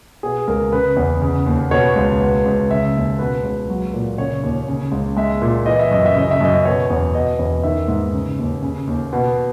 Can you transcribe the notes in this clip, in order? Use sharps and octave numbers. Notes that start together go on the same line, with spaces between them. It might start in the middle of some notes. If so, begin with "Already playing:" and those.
B2 G#4
C#2 A#4
C#3 B4
E2
C#3
D#2
B2 C#5
C#2
B2
C#2
C#3 E5
D#2
B2 B4
C#2
F#3
A#2
C#3 C#5
D#2
C#3
C#2
G#3 E5
A#2
E3 D#5
E5
F#2 D#5
E5
C#3 D#5
E5
F#2 D#5
B2 C#5
E2
B2 D#5
E2
D#3 E5
G#2
C#3
D#2
C#3
D#2
B2